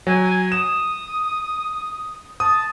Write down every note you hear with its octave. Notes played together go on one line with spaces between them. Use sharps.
F#3 G#5
D#6 E7
A5 D#6